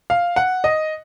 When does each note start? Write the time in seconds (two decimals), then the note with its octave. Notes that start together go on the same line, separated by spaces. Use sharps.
0.10 F5
0.36 F#5
0.64 D#5